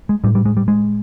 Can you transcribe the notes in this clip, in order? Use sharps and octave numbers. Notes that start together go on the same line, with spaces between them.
G#3
A2 G3
G3
G#3
G3
G#3